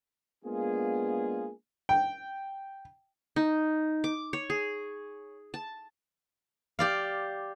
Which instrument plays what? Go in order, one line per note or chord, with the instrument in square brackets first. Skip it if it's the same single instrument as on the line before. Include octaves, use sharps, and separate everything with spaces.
[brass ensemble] G#3 A#3 B3 D4 F4 G#4
[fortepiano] G5
[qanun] D#4
D6
C#5
G#4
A5
[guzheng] G4 D5 F5